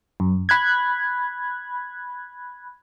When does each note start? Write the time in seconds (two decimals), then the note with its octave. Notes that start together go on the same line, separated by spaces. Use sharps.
0.20 F#2
0.49 B5 F#6 G#6